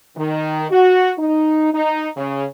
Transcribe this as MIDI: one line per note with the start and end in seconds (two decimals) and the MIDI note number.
0.16 0.66 51
0.70 1.11 66
1.18 1.68 63
1.73 2.08 63
2.17 2.44 49